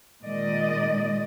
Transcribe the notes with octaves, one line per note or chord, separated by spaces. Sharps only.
A#2 D#3 G#3 D5 D#5